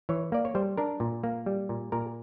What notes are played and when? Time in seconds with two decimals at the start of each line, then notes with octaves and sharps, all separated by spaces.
0.09 E3 C#5
0.32 A#3 D5
0.45 C#5
0.55 G3 C5
0.78 D4 A#4
1.00 A#2
1.24 A#3
1.46 G3
1.69 A#2
1.92 A#2 A#4